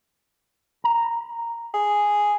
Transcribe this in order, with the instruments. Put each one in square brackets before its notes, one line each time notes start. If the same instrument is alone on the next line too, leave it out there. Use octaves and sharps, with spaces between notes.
[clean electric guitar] A#5
[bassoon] G#4